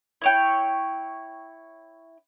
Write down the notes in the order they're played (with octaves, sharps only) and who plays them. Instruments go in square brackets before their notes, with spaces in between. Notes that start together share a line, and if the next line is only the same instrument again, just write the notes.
[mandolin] E4 C#5 G5